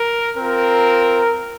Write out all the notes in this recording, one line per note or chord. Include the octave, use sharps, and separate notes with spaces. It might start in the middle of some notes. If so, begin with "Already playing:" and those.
Already playing: A#4
C4 F4 A#4